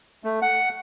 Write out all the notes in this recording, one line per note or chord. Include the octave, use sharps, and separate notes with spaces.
A3
F#5